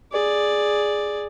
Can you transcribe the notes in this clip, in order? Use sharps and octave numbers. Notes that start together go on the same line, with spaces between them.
G#4 D5